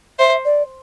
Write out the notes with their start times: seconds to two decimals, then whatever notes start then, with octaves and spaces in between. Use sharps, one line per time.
0.19 C5 E5
0.45 D5